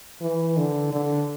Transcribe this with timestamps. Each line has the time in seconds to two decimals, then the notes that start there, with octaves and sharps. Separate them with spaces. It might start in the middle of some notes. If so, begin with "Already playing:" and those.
0.21 E3
0.57 D3
0.92 D3